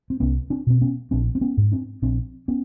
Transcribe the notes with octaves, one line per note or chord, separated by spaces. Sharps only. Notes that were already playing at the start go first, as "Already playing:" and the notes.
C4
C2 B3 C#4
C4 D4
B2 C4
B3 C#4
A#1 C4 D4
C4
B3 C#4
G#2
C4 D4
A#1 C4 D4
B3 C#4